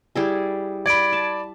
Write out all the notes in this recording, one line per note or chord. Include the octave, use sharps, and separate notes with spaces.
G3 E4 G#4
D5 B5 G#6 D7
A5